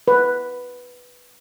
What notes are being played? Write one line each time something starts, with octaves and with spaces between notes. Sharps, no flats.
B4